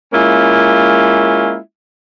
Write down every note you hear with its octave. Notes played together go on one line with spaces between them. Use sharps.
G#3 A#3 C#4 E4 F4